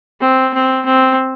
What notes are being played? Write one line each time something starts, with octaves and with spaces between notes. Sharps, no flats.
C4
C4
C4